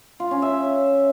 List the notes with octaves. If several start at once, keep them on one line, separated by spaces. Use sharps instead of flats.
F4
C#4
E5